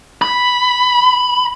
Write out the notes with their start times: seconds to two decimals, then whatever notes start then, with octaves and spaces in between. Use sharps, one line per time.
0.22 B5